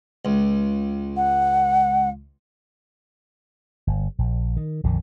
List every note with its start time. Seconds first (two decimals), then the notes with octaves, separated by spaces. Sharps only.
0.25 C#2
1.17 F#5
3.87 G1
4.18 A#1
4.57 D#3
4.84 A#1 F2 D3 D#3